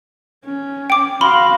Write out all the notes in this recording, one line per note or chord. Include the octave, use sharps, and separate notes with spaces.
C#4
G5 D6
F#4 F5 B5 C6